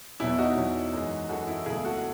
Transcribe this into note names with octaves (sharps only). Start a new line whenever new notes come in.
E2 B2 F#3 E4
D#4 F#4
E2 B2 F#3
F#2 E3 G#3
F#2 E3 G#3 F#4 A4
E4
C#2 B2 F#3 A3 E4 G#4
F#4 A4